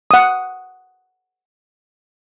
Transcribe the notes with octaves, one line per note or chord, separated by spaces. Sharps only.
F#5 D#6